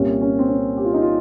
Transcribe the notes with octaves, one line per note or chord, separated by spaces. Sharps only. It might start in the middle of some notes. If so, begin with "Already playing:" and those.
Already playing: C2 A#2 G3 A#3 C#4
C#4
C4
C#4
G4
F4
D#4
F4